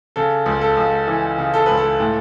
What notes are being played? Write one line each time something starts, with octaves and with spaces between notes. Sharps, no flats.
C#3 A4
C#2
A4
C#2
E3
C#3
A4
C#2 B4
A4
A2